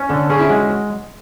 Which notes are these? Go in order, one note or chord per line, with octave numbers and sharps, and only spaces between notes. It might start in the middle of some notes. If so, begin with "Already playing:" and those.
Already playing: C#4
D3 A4
C#4 G#4
E4
G#3 F#4